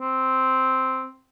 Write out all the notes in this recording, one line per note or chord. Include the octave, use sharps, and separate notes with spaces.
C4